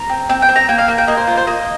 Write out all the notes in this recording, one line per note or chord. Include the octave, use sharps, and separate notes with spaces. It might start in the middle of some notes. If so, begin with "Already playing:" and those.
Already playing: A#5
C4
C4 G5
G5
C4
A#5
A#3 G5
F5
A#3
G5
A#3 D#5
C5
F4 C5
C5
A#3 D#5